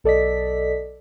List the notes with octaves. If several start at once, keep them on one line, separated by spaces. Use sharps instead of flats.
B1 A4 D5 D#5 B6